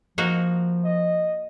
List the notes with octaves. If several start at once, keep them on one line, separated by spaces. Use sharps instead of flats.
F3 A#3 D#4 F#4
D#5